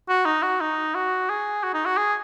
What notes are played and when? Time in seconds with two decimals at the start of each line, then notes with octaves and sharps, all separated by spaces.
0.09 F#4
0.25 D#4
0.43 F#4
0.61 D#4
0.95 F#4
1.29 G#4
1.64 F#4
1.74 D#4
1.86 F#4
1.97 G#4